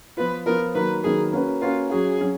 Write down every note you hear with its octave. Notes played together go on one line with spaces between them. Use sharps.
F3 B3 F4 B4
F3 B3 F4 A#4
D#3 F#3 A#3 B4
D#3 F#3 A#3 G#4
A#3 C#4 F#4 B4
A#3 C#4 F4 F#4 B4
F#3 C#4 F#4 G#4
F#3 C#4 F#4